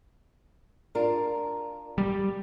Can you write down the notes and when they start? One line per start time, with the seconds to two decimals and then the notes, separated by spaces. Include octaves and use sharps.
0.95 D4 F4 A#4
1.98 G3